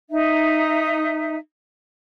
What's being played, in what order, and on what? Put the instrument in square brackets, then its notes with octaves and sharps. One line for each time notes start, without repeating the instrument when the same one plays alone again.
[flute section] D#4 E5